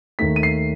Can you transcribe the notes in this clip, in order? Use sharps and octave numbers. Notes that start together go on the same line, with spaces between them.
D#2 D#3 A3 B6
D#7
C7